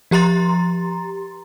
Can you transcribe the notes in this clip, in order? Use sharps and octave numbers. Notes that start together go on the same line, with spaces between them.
F3 G4 A#5 C6 A6